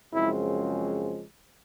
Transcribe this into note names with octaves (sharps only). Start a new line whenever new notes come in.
F#2 C#3 F3 G#3 C4 E4